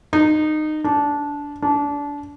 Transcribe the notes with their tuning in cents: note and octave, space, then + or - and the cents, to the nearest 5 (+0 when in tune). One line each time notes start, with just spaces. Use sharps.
D#4 -20
D4 -15
D4 -25